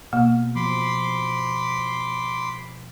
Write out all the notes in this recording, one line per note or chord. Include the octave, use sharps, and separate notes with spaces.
B2 A#3
F3 B5 C6 D6